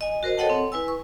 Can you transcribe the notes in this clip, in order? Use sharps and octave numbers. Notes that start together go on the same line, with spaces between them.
D#5 G#5
F#4 A#4 C5 D#5
A4 C#5 D#5 F#5 G5 A5
C4
E4 B4 G#5 E6
C#6